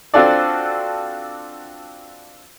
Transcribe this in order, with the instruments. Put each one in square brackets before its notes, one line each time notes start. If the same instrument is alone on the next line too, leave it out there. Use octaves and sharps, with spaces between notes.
[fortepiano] C4 D4 F4 F#4 A4 D5